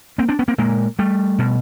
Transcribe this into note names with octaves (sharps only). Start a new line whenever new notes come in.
A#3 C4
C4 D4
B3 C#4
A#3 C4
A#2 G#3 A#3
G3 A3
B2